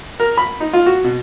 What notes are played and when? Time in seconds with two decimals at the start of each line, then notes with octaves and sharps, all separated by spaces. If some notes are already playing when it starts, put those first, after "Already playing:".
0.20 A#4
0.37 B5
0.60 D#4
0.73 F4
0.86 F#4
1.04 B2